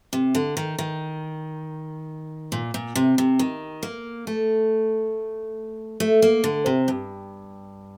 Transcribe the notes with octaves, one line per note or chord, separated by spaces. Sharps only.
C3
D3
D#3
D#3
A#2
A#2
C3
C3
D#3
A#3
A3
A3
A#3
D3
C3
G2